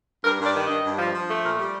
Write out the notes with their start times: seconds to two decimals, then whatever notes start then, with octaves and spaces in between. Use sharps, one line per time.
0.24 G2 A#4
0.40 G2 D5
0.54 D#3
0.64 G2 D#5
0.84 G2
0.99 F3
1.14 F3
1.29 A3
1.44 A#2 A#4
1.59 G3